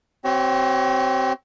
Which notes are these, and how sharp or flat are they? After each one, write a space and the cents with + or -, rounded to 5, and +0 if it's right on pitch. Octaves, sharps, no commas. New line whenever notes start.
C4 +0 F#4 +45 C#5 +0